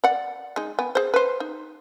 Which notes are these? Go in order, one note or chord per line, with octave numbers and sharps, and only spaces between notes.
D5 F#5
G#3 D#4
B3 G#5
G#4 C5
B4 C5
D#4